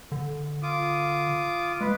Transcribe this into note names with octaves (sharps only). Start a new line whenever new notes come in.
D3
F4 D6 D#6
G#3 B4